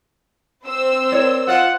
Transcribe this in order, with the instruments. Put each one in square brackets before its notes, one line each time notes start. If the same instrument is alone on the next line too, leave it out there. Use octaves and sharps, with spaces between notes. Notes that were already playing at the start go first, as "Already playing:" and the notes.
[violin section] C4 C5 E6
[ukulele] A#4 C#5 D5
[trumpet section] F4 F#5 [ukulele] D#5